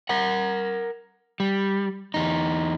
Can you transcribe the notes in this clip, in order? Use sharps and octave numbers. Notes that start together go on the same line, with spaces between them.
A#4 F#5
G3
E2 D#4